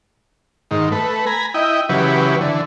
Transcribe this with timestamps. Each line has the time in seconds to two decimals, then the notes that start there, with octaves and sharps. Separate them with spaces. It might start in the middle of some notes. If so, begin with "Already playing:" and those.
0.71 G#2 D#3
0.92 A3 B4
1.26 G#5 A#5 B5
1.54 E4 D#5 G5
1.89 C#3 E3 F#3 G4 B4
2.41 D3 E3